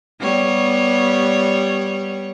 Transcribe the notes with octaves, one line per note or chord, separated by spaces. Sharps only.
G3 B3 C#5